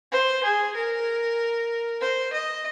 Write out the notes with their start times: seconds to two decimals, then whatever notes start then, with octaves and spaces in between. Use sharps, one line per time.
0.12 C5
0.43 G#4
0.75 A#4
2.01 C5
2.33 D#5